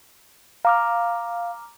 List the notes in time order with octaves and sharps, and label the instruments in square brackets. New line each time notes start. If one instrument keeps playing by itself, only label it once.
[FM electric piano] F5 [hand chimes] A#5 D6 F6